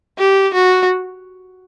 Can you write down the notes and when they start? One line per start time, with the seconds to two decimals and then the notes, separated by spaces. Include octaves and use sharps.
0.18 G4
0.54 F#4